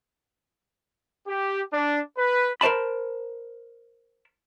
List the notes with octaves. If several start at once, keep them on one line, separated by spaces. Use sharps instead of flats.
G4
D4
B4
A#4 C5 D5 A5 B5